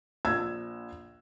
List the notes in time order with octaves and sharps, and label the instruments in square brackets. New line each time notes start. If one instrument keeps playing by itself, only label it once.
[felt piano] A#1 E6 G#6